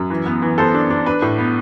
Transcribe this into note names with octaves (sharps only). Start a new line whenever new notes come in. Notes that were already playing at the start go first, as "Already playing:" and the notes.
Already playing: F#2
E3
B3
E3
B3 A4 C5
D4
D4
D4 B4
A2
B3